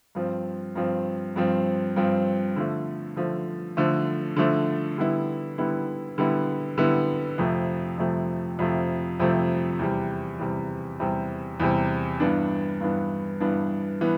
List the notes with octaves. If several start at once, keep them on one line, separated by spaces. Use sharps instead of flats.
G2 F3 C4
G2 F3 C4
G2 F3 C4
G2 F3 C4
D3 F3 A3
D3 F3 A3
D3 F3 A3
D3 F3 A3
D3 G3 B3 E4
D3 G3 B3 E4
D3 G3 B3 E4
D3 G3 B3 E4
F2 C3 F3 A3
F2 C3 F3 A3
F2 C3 F3 A3
F2 C3 F3 A3
E2 C3 G3
E2 C3 G3
E2 C3 G3
E2 C3 G3
G2 E3 B3 D4
G2 E3 B3 D4
G2 E3 B3 D4
E3 B3